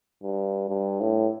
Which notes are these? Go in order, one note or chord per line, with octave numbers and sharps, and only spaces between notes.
G2
G2
A2